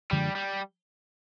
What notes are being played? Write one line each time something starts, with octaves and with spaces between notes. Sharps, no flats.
F#2 D3 F3 G3 G#3
G3